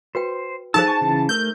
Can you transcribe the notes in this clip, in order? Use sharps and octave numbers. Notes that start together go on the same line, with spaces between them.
F#4 B4 C5 G5
F3 D#4 G#4 A4 C5 A5 E6
G#5 C#6
C#3 E3
A3 A#4 E6 G6